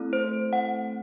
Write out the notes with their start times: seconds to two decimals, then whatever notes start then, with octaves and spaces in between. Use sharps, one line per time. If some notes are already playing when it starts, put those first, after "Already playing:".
Already playing: A3 C4 E4 A4
0.13 C5
0.53 F#5